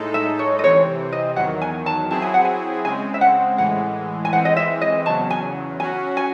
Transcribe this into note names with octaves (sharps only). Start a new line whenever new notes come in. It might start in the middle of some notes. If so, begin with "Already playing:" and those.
Already playing: A2 G#3 D#4 A4
E5
C#5
D#5
C3 E3 C4 C#5
D#5
E2 D#3 F#3 F#5
G#5
A5
F#3 C4 E4 G#4 A5
G#5
F#5
G#5
C#3 G#3 C4 G#5
E5
F#5
A2 E3 G#3 F#5
G#5
E3 G#3 C4 F#5
D#5
E5
D#5
E2 C#3 F#3 A5
G#5
F#3 C#4 F#4 G#5
G#5